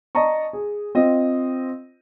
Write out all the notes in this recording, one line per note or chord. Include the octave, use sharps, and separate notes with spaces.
D5 D#5 A5 A#5 C#6
G#4
C4 F4 D#5